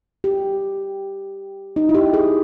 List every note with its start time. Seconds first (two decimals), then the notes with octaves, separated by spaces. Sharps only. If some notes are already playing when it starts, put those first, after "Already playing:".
0.24 G4
1.76 D#4
1.89 E4
1.95 G4
2.14 G#4